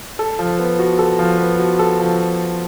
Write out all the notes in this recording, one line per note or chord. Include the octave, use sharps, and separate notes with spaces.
A4
F3
B3
F#4
A4
F3
B3
F#4
A4
F3